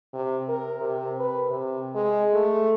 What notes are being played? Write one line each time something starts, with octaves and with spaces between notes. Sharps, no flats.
C3
A#4
C3
B4
C3
G#3
A3